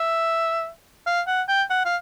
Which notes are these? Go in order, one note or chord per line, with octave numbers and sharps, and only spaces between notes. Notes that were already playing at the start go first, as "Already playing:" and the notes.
Already playing: E5
F5
F#5
G5
F#5
F5